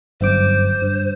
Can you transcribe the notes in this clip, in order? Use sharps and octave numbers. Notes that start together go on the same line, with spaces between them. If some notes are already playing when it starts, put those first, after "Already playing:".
G1 F#2 C5 D6
G2